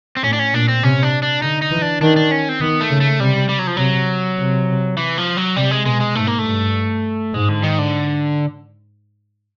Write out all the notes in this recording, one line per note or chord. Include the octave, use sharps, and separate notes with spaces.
C4
A2 C#4
D4
C#4
A#2 D4
C4
C3 C#4
D4
D4
D3 D#4
D#4
E3
D4
D#3 D4
D4
C#4
C4
D#3 B3
A3
C#3
A3
C3 G3
G3
F#3
F3
C3 F#3
C3
E3
F3
F#3
C3 G3
G#3
B2 G#3
G#3
G#2 A3
A#3
A3
G2
G#2 G#3
D3
D#3
D3